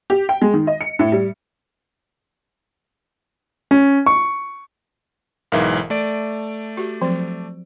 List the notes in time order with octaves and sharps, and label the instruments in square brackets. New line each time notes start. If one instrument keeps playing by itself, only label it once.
[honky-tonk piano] G4
G5
G#3
D#3
D#5
C#7
A2
G3
[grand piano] C#4
C#6
[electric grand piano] B1 G#2 E3 [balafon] A#4 E5 F5
[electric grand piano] A3 D5 D7
[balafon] F#4 G4
F3 F#3 C4